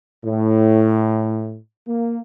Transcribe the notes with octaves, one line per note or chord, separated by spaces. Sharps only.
A2
A#3